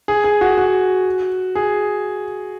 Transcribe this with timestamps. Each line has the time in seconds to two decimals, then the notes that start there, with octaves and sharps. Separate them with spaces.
0.08 G#4
0.24 G#4
0.41 F#4
0.58 F#4
1.55 G#4